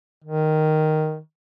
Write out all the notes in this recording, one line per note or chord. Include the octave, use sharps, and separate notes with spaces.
D#3